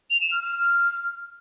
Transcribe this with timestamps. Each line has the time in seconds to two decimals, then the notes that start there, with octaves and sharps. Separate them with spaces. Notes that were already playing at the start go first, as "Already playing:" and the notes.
0.10 F7
0.21 E7
0.31 F6
0.42 F6